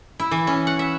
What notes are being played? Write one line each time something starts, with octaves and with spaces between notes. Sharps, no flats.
E4
E3
C#4
F#5
E5